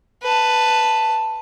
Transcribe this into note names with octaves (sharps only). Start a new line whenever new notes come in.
B4 A5